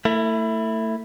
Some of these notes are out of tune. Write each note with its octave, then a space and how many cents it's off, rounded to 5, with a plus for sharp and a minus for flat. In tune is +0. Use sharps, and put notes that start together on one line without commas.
A3 +30 E4 +0